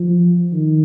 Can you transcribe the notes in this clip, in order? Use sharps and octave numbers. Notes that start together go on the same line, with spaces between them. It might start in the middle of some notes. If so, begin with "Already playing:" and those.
Already playing: F3
D#3